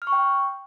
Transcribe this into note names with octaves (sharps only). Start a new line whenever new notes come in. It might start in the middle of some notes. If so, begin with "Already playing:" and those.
F6
C#6
G5